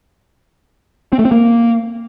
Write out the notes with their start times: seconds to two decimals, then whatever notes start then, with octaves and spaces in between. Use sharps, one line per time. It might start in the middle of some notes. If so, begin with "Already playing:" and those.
1.13 C4
1.19 A3
1.25 C4
1.32 A#3